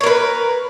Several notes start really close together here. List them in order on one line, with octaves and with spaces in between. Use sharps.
C#5 A#4 B4